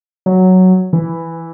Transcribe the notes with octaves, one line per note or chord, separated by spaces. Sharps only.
F#3
E3